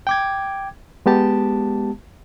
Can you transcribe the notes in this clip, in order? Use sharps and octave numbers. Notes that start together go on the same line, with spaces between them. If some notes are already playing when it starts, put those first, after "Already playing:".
G5 D6 G#6
G#3 B3 G4 A5